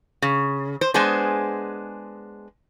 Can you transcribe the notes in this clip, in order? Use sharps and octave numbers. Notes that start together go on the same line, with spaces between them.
C#3
C5
G#3 B3 D4 G#4 C5